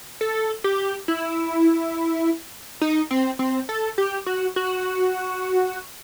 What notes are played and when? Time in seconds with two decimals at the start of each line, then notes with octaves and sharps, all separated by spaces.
0.21 A4
0.64 G4
1.08 E4
2.81 D#4
3.11 C4
3.39 C4
3.69 A4
3.98 G4
4.26 F#4
4.56 F#4